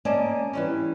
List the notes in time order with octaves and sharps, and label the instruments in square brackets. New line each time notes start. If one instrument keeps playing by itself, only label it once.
[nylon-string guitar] A#3 C#4 D5 D#5 G#5 A5
E3 G3 C#4